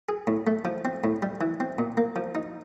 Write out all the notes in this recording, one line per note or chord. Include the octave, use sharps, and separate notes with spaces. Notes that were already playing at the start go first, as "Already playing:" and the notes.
G#4
A2
A3
F3
C4
A2
G3
E3
C4
A#2
A#3
F3
D#4